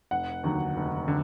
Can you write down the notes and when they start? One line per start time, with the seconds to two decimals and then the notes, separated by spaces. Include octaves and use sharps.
0.11 F1 F#5
0.44 D#2 D3 F#3
0.77 F1
1.08 D3